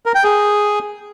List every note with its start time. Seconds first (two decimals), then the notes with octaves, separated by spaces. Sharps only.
0.06 A#4
0.15 G5
0.24 G#4